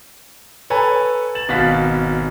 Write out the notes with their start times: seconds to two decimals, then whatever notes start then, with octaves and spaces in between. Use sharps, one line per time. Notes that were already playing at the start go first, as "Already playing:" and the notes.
0.70 A4 B4 C#5 G#5 A#5
1.35 A6 E7 F#7
1.48 G#1 B2 F#4 F5 A6 B6